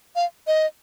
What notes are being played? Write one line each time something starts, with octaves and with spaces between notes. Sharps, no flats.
F5
D#5